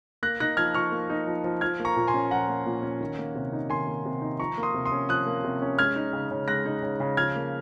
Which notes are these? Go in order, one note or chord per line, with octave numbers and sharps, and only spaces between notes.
A#3 F#6 A#6
D#4 F#6 A#6
F3 F6 G#6
F3 C#6 F6
A#3
D#4
F3
F3
F3 F6 G#6
A#3
A#5 C#6
A#2
G#5 C6
C#4
F3 F#5 A#5
A#3
A#2
C#4
D#3
A#3
C3
D#4
D#3 G#5 C6
A#3
C3
D#4
F3 A#5 C#6
A#3
C6 D#6
C3
C6 D#6
C#4
F3 D#6 F#6
A#3
C3
C#4
G#3 F6 G#6
D#4
C#3
C#3
G#3 F#6 A#6
D#4
C#3
C#3
F3 F6 G#6
A#3